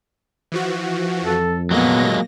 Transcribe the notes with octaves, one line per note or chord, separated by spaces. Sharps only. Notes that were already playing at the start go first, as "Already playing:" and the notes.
E3 F3 F#4
F2 A4
A#2 F#3 G#3 A#3 B3 A#6